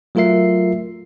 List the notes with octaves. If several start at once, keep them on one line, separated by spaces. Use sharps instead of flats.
F#3 A3 F4 A#4 E5 C7